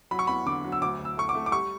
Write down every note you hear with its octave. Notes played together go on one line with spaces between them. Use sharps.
F#3 B5
C#6
E2 B5
D3 D6
F#3
E6
D2 D6
D2
E6
A3 C#6
D6
A3
D6
G3 C#6